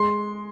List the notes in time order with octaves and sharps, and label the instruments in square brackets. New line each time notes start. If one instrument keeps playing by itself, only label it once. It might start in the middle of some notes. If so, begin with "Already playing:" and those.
Already playing: [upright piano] G#3 [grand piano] C6